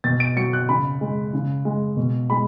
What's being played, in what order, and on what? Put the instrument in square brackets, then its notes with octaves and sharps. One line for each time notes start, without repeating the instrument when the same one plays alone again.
[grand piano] B2 A6
D7
F#3 C#7
F#6
C#3 B5
G#3
C#3
G#3
B2
G#3 B5